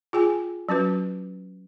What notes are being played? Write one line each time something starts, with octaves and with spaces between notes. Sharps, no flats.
F4 G#4 G5 G#5
F#3 C#4 F#4 B4